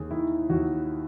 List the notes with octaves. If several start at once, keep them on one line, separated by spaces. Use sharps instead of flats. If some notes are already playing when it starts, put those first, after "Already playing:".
Already playing: D#2 G#4
D#3 E4
D#2 F#4